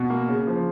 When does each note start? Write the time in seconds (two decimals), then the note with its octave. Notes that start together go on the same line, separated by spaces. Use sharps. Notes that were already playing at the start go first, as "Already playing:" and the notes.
Already playing: B2
0.10 A#3
0.29 C#3
0.47 F3